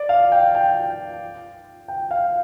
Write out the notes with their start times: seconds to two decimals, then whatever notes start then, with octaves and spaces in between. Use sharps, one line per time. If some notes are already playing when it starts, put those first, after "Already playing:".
Already playing: D5
0.09 F5
0.32 G5
0.55 G5
1.88 G5
2.11 F5